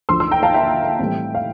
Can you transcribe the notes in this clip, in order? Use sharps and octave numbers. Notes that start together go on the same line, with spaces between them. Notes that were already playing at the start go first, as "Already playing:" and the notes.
D2 D3 F3 C6 E6
C6 E6
G5 A#5
F5 A5
E5 G5
A2 E3 G3 C4
F5